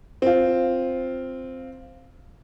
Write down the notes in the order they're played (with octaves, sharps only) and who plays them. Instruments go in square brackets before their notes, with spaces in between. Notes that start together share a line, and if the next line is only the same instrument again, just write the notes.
[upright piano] C4 F4